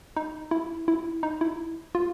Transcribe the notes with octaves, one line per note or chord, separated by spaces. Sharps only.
D#4
E4
E4
D#4
E4
F4